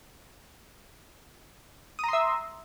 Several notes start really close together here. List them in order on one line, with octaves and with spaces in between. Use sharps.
D#6 A#5 C6 E5